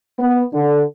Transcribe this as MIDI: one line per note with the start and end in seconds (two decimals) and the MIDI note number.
0.19 0.43 59
0.53 0.83 50